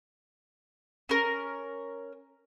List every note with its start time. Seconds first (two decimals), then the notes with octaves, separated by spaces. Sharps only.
1.09 C#4 A#4